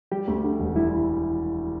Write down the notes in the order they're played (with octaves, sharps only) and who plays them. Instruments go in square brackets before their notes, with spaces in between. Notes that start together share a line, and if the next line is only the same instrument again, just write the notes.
[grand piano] G3 [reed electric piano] G4
[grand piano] D2
D3
E1
[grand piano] G3 [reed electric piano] E4